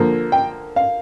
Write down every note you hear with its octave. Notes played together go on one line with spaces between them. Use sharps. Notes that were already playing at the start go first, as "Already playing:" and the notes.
Already playing: D3 F3 A#3
G5
F5